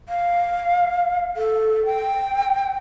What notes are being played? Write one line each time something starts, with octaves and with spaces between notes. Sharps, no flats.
F5
A4
G5